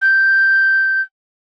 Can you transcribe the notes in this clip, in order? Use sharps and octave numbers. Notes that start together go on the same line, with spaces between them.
G6